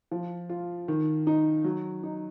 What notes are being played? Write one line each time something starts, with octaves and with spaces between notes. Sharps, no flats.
F3
F4
D#3
D#4
F#3
D#4